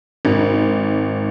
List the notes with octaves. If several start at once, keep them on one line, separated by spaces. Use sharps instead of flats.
G#1